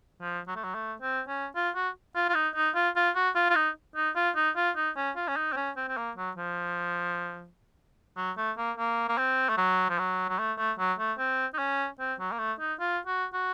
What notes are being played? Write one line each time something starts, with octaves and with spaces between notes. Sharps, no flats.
F3
F#3
A3
F#3
A3
C4
C#4
F4
F#4
F4
F4
D#4
D#4
F4
F4
F#4
F4
F4
D#4
D#4
F4
D#4
F4
D#4
C#4
F4
C#4
D#4
C4
C#4
C4
C4
A#3
F#3
F3
F#3
A3
A#3
A#3
A#3
C4
A3
F#3
F3
F#3
F#3
A3
A3
F#3
A3
C4
D#4
C#4
C4
F#3
A#3
A3
D#4
F4
F#4
F#4